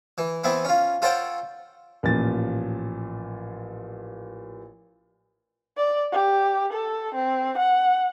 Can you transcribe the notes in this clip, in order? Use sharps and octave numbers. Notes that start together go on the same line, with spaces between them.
E3
E3 B3 C4 E4
C#4 F4
F4 A4 C5 C#5 F#5 G5
A1 A#2 F3 A6
D5
G4
A4
C4
F#5